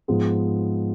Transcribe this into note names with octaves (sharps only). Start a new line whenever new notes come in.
G#2 F3 G#3 B3